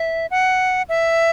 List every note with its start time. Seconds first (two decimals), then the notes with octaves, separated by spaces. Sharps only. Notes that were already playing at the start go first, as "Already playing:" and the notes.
Already playing: E5
0.31 F#5
0.89 E5